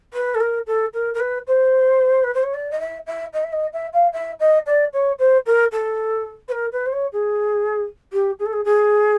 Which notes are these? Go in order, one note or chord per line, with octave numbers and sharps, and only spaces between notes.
B4
A4
A#4
A4
A#4
A#4
B4
C5
B4
C5
C#5
D5
D#5
E5
E5
D#5
E5
D#5
E5
F5
E5
D#5
D5
C#5
C5
A#4
A4
B4
A#4
B4
C5
C#5
G#4
G4
G#4
A4
G#4
G#4